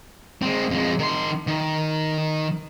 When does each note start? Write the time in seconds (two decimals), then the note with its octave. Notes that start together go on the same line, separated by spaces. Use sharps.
0.42 G#3 C4
0.70 F2 G#3
0.99 D#3 C6
1.47 D#3